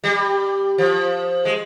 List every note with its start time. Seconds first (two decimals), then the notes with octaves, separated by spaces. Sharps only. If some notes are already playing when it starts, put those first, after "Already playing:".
0.04 G3
0.78 F3
1.45 G#3